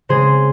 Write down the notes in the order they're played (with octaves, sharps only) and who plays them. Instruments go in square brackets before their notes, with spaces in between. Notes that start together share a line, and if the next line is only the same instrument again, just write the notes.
[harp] C#3 G#3 C4 G#4 C5